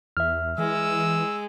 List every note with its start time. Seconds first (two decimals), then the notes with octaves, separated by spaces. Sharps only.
0.17 E2 E5 F6
0.58 E3 G#3 E6